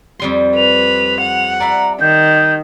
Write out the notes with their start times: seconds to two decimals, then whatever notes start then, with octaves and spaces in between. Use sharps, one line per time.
0.20 F2 G3 C6
0.56 B4 F7
1.21 F#5
1.60 D5 E5 A#5 B5
2.00 D#3 G6